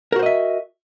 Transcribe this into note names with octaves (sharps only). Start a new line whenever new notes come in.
F#4 A#4 C5 D#5 E5